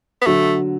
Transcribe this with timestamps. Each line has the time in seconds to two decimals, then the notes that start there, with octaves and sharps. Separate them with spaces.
0.22 B3
0.26 D3 F#3 A3